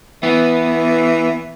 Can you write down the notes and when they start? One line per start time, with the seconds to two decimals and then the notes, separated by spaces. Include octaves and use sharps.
0.23 E3 B3